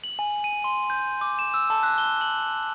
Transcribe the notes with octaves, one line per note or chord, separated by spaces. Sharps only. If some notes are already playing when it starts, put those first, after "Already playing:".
F#7
G#5
D#7
C6
G6
D6
E7
E6
A5
F#6
G7
F#7